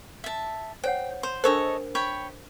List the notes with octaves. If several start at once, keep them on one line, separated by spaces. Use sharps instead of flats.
E5 A5
C5 C#5 F#5 G5
C5 B5
D4 A4 A#4 C5 C#5 D#5
C#5 G5 B5